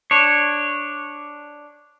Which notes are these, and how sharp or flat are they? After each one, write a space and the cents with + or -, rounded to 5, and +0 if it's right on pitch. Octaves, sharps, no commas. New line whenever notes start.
D4 +0 C#5 -10